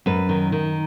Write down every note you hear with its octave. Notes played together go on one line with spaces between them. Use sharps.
F#2 B4
D#3
D#3